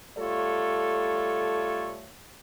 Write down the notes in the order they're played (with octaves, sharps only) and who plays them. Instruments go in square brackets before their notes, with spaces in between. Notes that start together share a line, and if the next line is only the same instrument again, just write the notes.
[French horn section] G3 A3 F4 A4 C#5